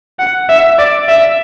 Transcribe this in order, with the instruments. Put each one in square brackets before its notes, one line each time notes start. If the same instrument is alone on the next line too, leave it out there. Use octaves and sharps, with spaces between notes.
[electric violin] F#5
E5
D5
E5